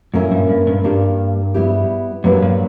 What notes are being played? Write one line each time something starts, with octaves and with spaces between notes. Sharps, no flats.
F#2 A#2 A#3 C#4 E4 A#4
G2
G2
G2
G2 A#3 D4 G4
G3 B3 E4 G4
F#2 F#3 A#3 D4 G4 B4
G2